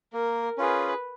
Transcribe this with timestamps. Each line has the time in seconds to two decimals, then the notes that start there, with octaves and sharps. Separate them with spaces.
0.13 A#3 A#4
0.58 C#4 F4 G#4 B4